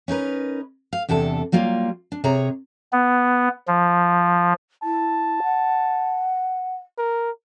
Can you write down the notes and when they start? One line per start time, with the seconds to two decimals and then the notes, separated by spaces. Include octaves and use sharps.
0.08 C#4 D#4 A#4 B4
0.93 F5
1.09 E2 C3 D4 A4 A5
1.52 F#3 G3 A#3 F4
2.12 D4
2.24 C3 G#4 C#5 A#5
2.92 B3
3.67 F3
4.83 E4 A5
5.43 F#5
6.98 A#4